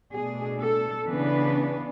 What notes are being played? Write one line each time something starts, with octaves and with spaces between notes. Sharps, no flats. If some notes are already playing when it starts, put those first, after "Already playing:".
B2 A3 D4 G#4
A4
C#3 E3 B3 D4 B4